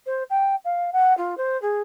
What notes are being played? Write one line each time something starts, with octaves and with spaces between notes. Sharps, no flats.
C5
G5
F5
F#5
F4
C5
G#4